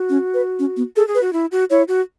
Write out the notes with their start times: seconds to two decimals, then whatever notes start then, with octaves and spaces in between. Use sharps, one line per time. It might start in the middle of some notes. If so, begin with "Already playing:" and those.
Already playing: F#4
0.10 C#4
0.34 B4
0.59 C#4
0.77 B3
0.96 G#4 A4
1.08 G#4
1.15 B4
1.21 F#4
1.33 E4
1.52 F#4
1.70 E4 C#5
1.88 F#4